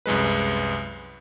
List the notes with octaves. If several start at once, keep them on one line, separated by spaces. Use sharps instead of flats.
C2 F#2 G#3 B4